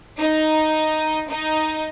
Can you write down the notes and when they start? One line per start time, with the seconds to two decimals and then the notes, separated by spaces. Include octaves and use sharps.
0.19 D#4
1.30 D#4